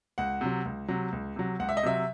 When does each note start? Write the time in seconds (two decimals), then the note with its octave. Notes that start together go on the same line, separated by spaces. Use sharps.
0.18 C#2 F#5
0.41 C3 F#3
0.65 C#2
0.88 C3 F#3
1.12 C#2
1.36 C3 F#3
1.59 C#2 F#5
1.69 E5
1.77 D#5
1.83 C3 F#3 E5